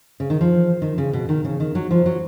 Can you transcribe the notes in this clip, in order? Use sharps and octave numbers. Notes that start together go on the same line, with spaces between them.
C#3
D#3
F3
D#3
C#3
B2
D#3
C#3
D#3
F#3
F3
F#3